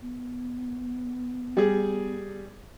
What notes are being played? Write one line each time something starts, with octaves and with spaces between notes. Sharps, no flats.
B3
G3 G#4